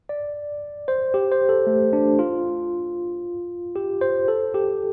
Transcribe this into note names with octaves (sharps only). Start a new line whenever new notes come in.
D5
C5
G4
C5
A4
A3
D4
F4
G4
C5
A4
G4